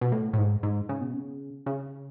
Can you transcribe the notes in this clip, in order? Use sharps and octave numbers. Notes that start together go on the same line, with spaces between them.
B2
A2
A2
G#2
G#2
C#3
B2
C#3
C#3